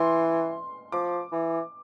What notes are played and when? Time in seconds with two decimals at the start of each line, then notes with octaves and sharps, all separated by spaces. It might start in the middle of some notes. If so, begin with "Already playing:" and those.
Already playing: E3 C6
0.92 F3 D6
1.32 E3